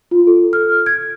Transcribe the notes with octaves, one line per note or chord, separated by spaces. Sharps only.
F4
A4
F6
G#6